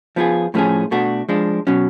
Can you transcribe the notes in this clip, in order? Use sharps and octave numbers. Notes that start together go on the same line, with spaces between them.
F3 B3 F4 G#4
A2 F3 A3 C#4 G#4
B2 A3 D4 F#4
F3 G#3 D4
B2 F#3 C#4